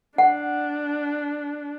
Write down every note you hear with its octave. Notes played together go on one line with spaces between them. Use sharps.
D4 F#5